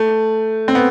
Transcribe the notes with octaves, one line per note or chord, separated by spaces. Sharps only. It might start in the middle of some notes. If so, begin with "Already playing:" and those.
Already playing: A3
C4
B3